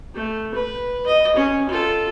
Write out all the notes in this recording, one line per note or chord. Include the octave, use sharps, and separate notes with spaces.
A3
B4
D#5
C#4
F4 A4